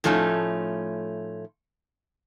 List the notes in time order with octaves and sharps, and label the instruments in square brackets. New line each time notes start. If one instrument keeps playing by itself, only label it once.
[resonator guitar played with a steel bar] A2 F3 A3 C#4 D#4